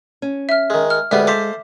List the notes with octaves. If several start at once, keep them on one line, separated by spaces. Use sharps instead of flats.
C#4
E5 F6
D#3 G#3
F6
D2 G3 G#3 B3 G#4 E5 G#5
A4 C5 F5 D6 B6